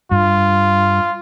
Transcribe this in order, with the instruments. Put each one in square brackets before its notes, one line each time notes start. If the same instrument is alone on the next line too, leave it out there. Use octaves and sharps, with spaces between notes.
[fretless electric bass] G2 [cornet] F4